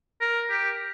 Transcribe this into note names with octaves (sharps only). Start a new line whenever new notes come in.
A#4
G4